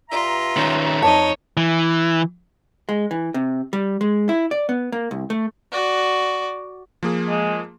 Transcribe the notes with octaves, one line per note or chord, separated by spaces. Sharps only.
G2 F4 E5 A#5
D#3 C#4
F2 D#4 C#5 A5
E3
G#3
E3
C3
G3
G#3
E4
D5
B3
A#3
C2
A3
F#4 D5
F3 A#3 G#4
G#3